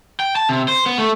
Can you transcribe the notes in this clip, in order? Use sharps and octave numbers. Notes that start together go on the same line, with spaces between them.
G5
A5
C3
C5
B3
A3